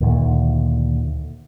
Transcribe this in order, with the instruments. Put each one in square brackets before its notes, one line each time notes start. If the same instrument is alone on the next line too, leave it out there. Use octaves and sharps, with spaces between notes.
[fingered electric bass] D2 A#2 D#3